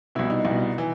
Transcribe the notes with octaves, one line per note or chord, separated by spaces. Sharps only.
C2 B2 E4
D#4
C2
B2
E3